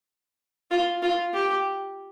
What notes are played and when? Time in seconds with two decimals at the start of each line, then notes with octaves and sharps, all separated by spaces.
0.71 F4
1.02 F4
1.34 G4